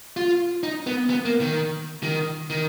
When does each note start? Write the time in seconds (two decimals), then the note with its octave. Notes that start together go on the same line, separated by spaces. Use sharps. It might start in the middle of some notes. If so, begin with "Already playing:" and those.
0.17 F4
0.63 D#4
0.87 B3
1.10 B3
1.25 A#3
1.41 D#3
2.03 D#3
2.50 D#3